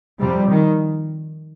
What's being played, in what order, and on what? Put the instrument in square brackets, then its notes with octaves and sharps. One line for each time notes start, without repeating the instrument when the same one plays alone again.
[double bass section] F2 C3 G3
D#3